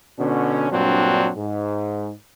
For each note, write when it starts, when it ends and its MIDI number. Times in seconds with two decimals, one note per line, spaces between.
0.19 0.70 47
0.19 0.70 50
0.19 0.70 61
0.70 1.30 43
0.70 1.30 46
0.70 1.30 54
0.70 1.30 60
0.70 1.30 62
1.37 2.10 44